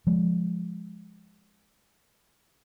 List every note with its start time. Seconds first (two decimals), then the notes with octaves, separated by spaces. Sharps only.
0.07 F3 G#3